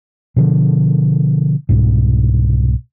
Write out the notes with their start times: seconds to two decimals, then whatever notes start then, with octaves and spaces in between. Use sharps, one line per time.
0.36 B2 D3 F3
1.69 C2 G#2 B2